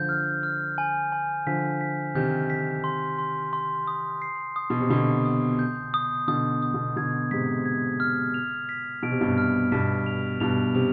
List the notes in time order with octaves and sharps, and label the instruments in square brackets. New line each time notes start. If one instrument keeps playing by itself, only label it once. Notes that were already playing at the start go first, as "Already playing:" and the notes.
Already playing: [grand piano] D3 F3 [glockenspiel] G6
[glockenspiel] F6
F6
G#5
G#5
[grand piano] D3 F3 [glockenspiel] B6
[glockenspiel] B6
[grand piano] C3 D#3 [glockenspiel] G6
[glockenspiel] B6
C6
C6
C6
D#6
C7
D#6
[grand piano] B2
C3
[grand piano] B2 D3 [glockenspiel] D#6
[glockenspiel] D#6
G6
D#6
[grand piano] B2 D3 [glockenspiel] D#6
[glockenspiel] D#6
[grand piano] B2 D3
[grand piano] B2 D3 [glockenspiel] G#6
[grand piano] G#2 C3 [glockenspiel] B6
[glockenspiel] G#6
F6
F7
B6
[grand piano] B2 [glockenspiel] D7
[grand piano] C3
G2 B2
[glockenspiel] F6
[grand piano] G2 B2 [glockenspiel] B6
[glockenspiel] F7
[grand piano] G2 B2 [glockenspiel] F7
[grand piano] C3 [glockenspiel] F7